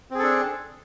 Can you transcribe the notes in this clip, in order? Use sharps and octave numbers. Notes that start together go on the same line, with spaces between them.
C4 D4 G#4 A4